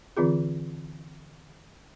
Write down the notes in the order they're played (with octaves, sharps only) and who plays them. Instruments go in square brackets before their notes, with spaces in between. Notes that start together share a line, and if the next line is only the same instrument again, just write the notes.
[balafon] D3 E3 C4 F4 G#4